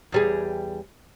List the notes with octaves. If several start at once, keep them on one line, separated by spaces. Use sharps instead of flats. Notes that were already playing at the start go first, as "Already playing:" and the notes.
E2 G3 G#4